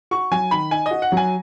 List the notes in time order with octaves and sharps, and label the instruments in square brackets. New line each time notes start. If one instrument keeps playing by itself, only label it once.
[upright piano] F#4 [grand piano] C#6
[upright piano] F#3 [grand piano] G#5
[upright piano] D#3 [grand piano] B5
[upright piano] D#4 [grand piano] G#5
[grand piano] D#5
[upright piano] F#4
[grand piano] F#5
[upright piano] F#3
[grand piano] G#5